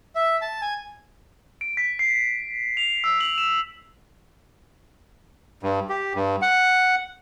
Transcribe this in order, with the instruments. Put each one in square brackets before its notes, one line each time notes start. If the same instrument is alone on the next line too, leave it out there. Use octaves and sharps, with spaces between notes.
[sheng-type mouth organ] E5
A5
G#5
[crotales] D7
B6
C7
F7
E6
F#7
E7
[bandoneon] G2
G4
G2
F#5